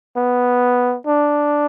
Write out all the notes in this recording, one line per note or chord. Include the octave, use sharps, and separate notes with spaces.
B3
D4